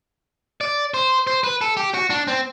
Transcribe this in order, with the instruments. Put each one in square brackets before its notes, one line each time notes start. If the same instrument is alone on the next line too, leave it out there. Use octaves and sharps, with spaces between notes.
[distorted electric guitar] D5
C5
C5
B4
A4
G4
F#4
D4
C4